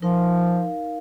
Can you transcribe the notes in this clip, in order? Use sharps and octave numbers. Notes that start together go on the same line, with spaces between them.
F3 D#4 A#4 F5